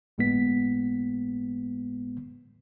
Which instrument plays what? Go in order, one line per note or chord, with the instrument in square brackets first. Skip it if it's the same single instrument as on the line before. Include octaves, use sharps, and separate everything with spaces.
[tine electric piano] G1 A2 G#3 A#3 B3 B6